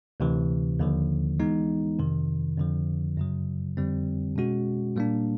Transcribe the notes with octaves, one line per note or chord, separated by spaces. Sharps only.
D2 C3 E3
D#2 D3 F3
E3 G#3 B3 D#4
F2 C3 D#3
F2 D3 F3
F#2 C#3 F#3
F2 D3 G3 C4
B2 G#3 C#4 F#4
A#2 G3 A#3 D4